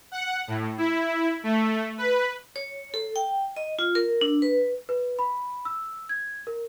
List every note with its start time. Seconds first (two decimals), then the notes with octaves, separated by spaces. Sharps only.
0.12 F#5
0.48 A2
0.78 E4
1.43 A3
1.98 B4
2.56 C#5
2.94 A4
3.16 G5
3.56 D#5
3.79 F4
3.95 A#4
4.21 D4
4.42 B4
4.89 B4
5.19 B5
5.65 E6
6.09 G#6
6.47 A#4